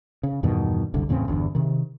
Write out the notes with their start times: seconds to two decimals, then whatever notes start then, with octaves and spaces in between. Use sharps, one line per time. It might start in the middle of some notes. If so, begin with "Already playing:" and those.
0.23 C#3
0.43 E2 G2 B2 D#3
0.94 F#1 C2 D3
1.09 E2 A2 C#3 C4
1.28 G1 E2 D4
1.55 C3 D#3